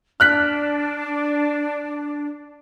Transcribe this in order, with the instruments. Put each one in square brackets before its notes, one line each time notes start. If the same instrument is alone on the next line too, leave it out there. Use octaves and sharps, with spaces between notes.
[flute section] D4 [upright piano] F6 F#6 B6